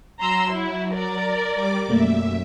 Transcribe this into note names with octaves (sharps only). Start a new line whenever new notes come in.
F#3 A#5 C6 E6
E4
A#4 D5
G3 D6
F#2 B2 A3 A#3 E5